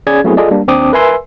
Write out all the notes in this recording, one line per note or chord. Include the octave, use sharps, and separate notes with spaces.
C#4 G#4 D5 G#6
F#3 A3 B3 C4 E4 G#4
F4 G#4 A4 D5 D#5
G3 A#3 D4
D#2 C4 D4 D6 D#6
A#4 B4 E5 G#5 C6 E6